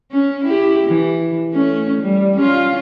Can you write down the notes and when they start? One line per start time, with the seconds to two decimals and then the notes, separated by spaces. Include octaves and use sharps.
0.12 C#4
0.44 E4 G4
0.88 E3
1.52 A3 C#4
2.01 G3
2.36 C#4 F4